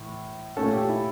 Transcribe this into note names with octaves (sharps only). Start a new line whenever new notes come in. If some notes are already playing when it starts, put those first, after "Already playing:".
Already playing: A2 E3
A#2 A3 C#4 A4
G4
E4